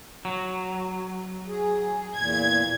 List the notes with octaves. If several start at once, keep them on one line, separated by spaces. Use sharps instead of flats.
F#3
G#4
E2 A#2 G#6